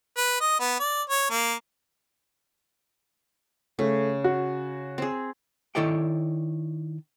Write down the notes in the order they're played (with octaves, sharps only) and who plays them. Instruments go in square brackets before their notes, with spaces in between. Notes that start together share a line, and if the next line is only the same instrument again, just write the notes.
[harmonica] B4
D#5
B3
D5
C#5
A#3
[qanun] C#3 [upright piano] A3
[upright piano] F#4
[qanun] C4 G#4
[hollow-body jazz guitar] D#3 E4 A4 C#5 D5 G5